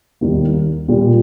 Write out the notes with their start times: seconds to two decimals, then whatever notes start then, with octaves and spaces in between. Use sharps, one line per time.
0.21 D#2 D#3 G3 A#3
0.88 A#2 G3 A#3